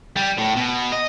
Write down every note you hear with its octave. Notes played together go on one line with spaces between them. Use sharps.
G3
A2
B2
D#5